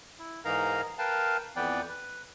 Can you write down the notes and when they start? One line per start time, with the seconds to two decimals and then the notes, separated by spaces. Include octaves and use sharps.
0.19 E4
0.45 G#2 E3 D#4 A#4 F5 A#5
0.98 A#4 B4 F5 G5 A5
1.56 F2 E3 B3 B4 D5 G5
1.89 B4